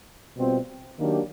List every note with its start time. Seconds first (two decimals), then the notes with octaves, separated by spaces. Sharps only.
0.36 B2 G3 C4 F4
0.99 D#3 F#3 A#3 D4 G4